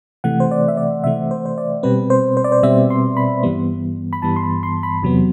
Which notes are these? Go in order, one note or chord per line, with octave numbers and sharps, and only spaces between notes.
C3 E3 A3 F#5
C5
D5
E5
D5
C3 E3 A3 E5
C5
C5
D5
B2 G3 C4 B4
C5
C5
D5
C5
B2 G3 C4 E5
C6
B5
G2 E3 G3 B3
B5
G2 E3 G3 B3 A5
C6
B5
C6
B5
E2 C3 F#3 B3